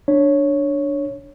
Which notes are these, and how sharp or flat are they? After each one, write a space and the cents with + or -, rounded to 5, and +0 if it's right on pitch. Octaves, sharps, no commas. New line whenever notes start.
D4 +0 C#5 +0